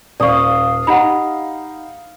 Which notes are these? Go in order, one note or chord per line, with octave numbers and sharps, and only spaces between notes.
D#1 D5 F5 C#6 D#6
D#4 G4 F#5 A#5 B5